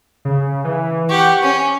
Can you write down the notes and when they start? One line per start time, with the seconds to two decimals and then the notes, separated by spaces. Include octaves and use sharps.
0.25 C#3
0.65 E3
1.09 G4 F#5 C#6
1.42 C#4